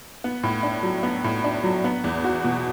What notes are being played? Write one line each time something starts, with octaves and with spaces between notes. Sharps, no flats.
B3
A2
D4
F#3
B3
A2
D4
F#3
B3
E2
F#4
B2